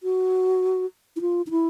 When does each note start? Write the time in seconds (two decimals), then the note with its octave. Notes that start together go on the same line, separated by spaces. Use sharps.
0.03 F#4
1.16 E4
1.21 F4
1.47 D#4
1.51 E4